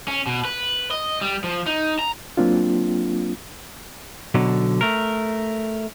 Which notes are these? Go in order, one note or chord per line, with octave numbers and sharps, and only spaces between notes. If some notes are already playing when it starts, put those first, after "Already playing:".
C#4
B2
B4
D#5
G3
F3
D#4
A#5
F#3 A#3 C4 D4 F4
B2 D3 F#3
A3 A#4